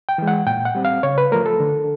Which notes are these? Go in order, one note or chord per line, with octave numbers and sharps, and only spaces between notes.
G5
E3 G#3
F#5
A#2 G5
F#5
G3 C4
F5
C#3 C#5
B4
F3 A3 A#4
A4
D3